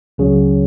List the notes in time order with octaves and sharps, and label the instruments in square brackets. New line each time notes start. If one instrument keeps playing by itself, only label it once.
[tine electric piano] C#2 C#3 F#3